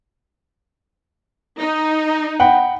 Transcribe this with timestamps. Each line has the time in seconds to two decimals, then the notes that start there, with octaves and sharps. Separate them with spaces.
1.59 D#4
2.40 F#5 G5 B5